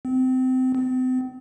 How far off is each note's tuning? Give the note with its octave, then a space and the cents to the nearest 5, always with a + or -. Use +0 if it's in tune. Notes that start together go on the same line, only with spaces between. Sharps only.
C4 -25
C4 -40